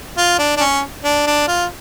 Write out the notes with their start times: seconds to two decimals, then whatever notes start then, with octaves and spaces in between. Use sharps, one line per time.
0.17 F4
0.38 D4
0.57 D4
0.60 C#4
1.04 D4
1.27 D4
1.48 F4